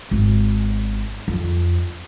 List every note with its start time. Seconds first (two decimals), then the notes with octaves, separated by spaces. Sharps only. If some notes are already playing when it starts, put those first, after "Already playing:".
0.11 G#1
1.28 F2